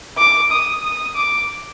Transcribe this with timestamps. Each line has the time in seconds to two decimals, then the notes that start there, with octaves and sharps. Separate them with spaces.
0.18 D6
0.51 D#6
0.84 D#6
1.16 D6